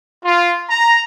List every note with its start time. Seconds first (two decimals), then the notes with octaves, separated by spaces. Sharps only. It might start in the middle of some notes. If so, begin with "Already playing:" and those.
0.24 F4
0.69 A#5